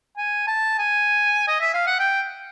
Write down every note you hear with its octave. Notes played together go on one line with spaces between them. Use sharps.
G#5
A5
G#5
D#5
E5
F5
F#5
G5